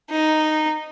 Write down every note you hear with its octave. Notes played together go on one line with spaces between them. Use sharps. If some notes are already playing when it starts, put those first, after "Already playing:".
D#4